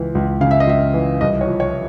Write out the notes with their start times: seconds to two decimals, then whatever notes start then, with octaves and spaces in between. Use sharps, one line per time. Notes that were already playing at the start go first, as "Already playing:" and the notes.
Already playing: C#2 E3
0.15 C#2
0.41 C#3 F5
0.51 E5
0.60 D#5
0.67 C#2 E5
0.94 E3
1.21 C2 D#5
1.41 C#5
1.47 F3
1.60 C#5